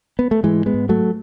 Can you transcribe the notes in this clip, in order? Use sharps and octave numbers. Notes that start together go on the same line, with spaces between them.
B3
A3
G#2 E3 G#3
G#3 B3
G#2
F#3 A3